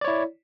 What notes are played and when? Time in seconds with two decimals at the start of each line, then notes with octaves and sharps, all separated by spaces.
0.01 D5
0.05 C#5
0.08 E4